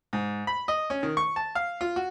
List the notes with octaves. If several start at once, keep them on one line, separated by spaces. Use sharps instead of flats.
G#2
B5
D#5
C#4
D#3
C#6
A5
F5
F4
F#4